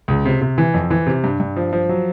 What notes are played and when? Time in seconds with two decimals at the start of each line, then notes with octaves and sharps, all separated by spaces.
0.08 C#2
0.25 C3
0.41 C3
0.58 E3
0.74 F2
0.90 E3
1.07 C3
1.24 G2
1.40 G2
1.57 F3
1.73 F3
1.89 F#3